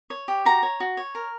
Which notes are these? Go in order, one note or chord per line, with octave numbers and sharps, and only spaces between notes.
C#5
G4
F#4 A#5
C#5
F#4
C#5
A#4